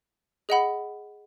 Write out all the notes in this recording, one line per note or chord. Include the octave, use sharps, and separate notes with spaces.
G#4 D#5 F#5 B5